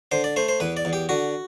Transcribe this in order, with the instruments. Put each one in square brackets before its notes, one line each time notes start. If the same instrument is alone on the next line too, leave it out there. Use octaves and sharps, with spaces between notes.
[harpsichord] D3 C5
D5
A3 C5
C5
E2 B4
D5
E2
G4
D3 F#4